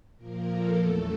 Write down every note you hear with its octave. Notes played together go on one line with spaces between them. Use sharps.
A#2 F3 A#3 A#4
A4
E2 C#3 F#3 A3